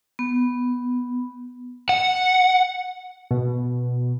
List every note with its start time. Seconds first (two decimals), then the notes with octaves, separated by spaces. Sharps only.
0.19 B3
1.89 F#5
3.31 B2